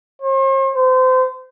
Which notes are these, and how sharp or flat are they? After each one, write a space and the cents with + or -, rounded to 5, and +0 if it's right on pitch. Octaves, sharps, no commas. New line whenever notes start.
C5 +45
C5 -30